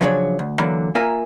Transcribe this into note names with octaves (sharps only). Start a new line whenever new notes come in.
C#3 F3 F#3 D4 G#4 C#5
D2
D3 E3 F#3 A#3
A#3 F4 A#4 E5 G#5